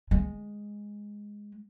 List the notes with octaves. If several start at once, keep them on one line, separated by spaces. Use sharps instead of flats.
G#3